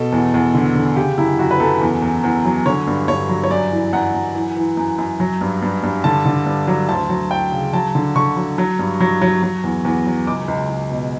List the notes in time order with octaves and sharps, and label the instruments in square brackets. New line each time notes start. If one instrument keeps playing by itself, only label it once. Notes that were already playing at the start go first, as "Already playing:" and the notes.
Already playing: [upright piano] B2 A4
E2
E2
D3
D3
C#3 G4
F#2 E4
F#2 F#4
B4
F#2 A4
E2
E2
E2
F#3
D3 C#5
G2
G2 C#5
F#3
C#5
F#2 D5
E3
F#2 F#5
F#2
E3
E3
F#2
F#2
F#3
G2
G2
G2
D3 A5
D3
G2
F#3
D2 A5
F#3
F#3 G5
C#3
F#3 A5
D3
D3 C#6
F#3
F#3
G2
F#3
F#3
F#3
E2
E2
F#3
C#2 D6
C#2
C#2
B2